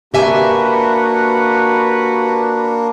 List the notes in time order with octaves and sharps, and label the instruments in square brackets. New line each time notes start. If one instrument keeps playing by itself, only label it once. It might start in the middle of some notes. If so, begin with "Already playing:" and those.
[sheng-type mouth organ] A#3 D4 [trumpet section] F#4 B4 [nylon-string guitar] G4 E5 G#5